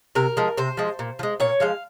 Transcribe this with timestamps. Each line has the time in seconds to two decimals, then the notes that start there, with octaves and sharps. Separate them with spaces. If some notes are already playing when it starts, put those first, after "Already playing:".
0.15 C3 A#4
0.37 F3 G#3
0.57 C3 C5
0.77 F3 G#3
0.99 A#2
1.19 F3
1.23 G#3
1.40 A#2 C#5
1.60 F3 G#3 F5